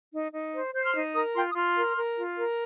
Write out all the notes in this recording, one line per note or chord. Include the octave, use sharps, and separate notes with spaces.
D#4
D#4
C5
C5 G6
C6 F6
D#4
A#4 A#5 D#6
F4 G5 C6
D#6
F4 C6 F6
A#4
A#4
F4
A#4